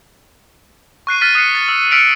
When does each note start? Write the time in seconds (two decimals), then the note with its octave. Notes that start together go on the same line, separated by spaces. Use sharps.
1.07 C#6 F#6 C7 D#7
1.21 F6 F#6 A6 B6 D#7
1.35 D#6 F6 F#6 C7 C#7
1.55 A6
1.68 E6
1.91 E6 F6 B6 C#7 D7 F7